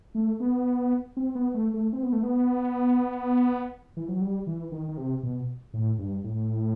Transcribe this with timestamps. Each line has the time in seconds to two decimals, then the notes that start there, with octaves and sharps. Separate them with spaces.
0.15 A3
0.40 B3
1.17 C4
1.35 B3
1.54 A3
1.74 A3
1.93 C4
2.03 B3
2.13 A3
2.23 B3
3.97 E3
4.09 F#3
4.21 G3
4.47 E3
4.72 D#3
4.89 D#3
4.97 C3
5.23 B2
5.74 A2
5.99 G2
6.24 A2